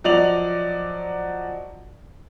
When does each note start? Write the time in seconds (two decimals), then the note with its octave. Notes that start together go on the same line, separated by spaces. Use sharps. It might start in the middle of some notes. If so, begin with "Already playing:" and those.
0.04 F3 F#3 D5 D#5 F7 F#7